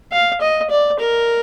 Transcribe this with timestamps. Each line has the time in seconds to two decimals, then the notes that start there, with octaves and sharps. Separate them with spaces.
0.12 F5
0.41 D#5
0.70 D5
0.99 A#4